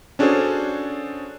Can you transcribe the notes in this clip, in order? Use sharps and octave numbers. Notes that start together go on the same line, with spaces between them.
C#4 D4 F#4 G#4 A4 C5